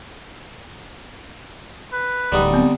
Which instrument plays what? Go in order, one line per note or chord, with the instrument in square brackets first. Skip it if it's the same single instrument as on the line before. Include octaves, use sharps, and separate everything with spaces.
[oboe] B4
[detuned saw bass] D1 [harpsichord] D3 G3 D#4
[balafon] B3 C4